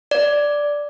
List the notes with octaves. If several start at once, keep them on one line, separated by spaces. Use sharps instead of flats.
D5